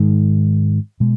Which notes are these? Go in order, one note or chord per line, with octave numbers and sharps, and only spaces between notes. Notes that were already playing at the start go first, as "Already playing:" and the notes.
Already playing: G#2 D#3 G#3
B2 G#3